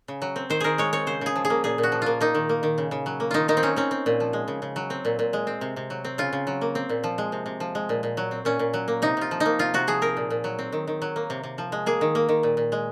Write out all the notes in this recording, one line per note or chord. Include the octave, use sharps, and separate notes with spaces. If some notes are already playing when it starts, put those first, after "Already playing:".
C#3
F#3
C4
D#3 C5
D#3 G#4 A#4
G#3 C#5
C4 C#5
C#3 C5
C#3 G#4
F3
G#4
A#3
A#2 G#4
A#2
F#4
F3
A#3 F4
A#3 D#4
D#3
A#3
D#3
C#3
C#3
F#3
A#3
D#3 D#4 F4
D#3 D#4
C4
F#3 C#4
C4 C#4
C4
A#2
F3
G#3
C#3
C#3
F#3
C4
A#2
A#2
G#3
C4
C3
C3
F#3
C4
C#3 F4
C#3
F#3
A#3
C4
A#2
F3
G#3
C3
C3
F3
G#3
A#2
A#2
F#3
C4
A#2 C#4
A#2
F#3
A#3
C3 D#4
C3 F4
F3
D#4
A#3
C3 F4
C3 F#4
F3 G#4
C4 A#4
A#2
A#2
F#3
C4
D#3
D#3
F#3
A#3
C3
C3
F3
G#3
A#3 G#4
D#3
A#3
D#3
A#2
A#2
G#3